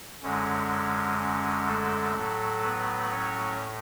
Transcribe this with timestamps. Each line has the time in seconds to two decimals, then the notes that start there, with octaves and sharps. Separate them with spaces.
0.23 F#2 D3 G#3 C#4
1.19 C#4
1.67 A3 A4
2.15 A2 F#3 A3
2.63 B3 B4
3.11 C#4 C#5